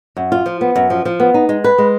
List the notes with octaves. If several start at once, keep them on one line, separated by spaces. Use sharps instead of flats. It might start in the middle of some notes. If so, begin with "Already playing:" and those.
F#2
F4
F3
B3
F#2
F3
F3
B3
D#4
G#3
B4
G#3